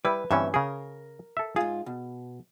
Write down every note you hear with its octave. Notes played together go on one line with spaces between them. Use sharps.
G3 E4 B4
D2 G2 E3 C4 C#4 E5
C#3 G#4 A#4
A4 E5
G#2 F4 G#4
B2